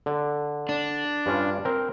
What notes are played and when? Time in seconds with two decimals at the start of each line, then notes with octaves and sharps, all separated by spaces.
0.06 D3
0.69 D4
1.26 G2 C#4 F4
1.65 C4 A#4 C5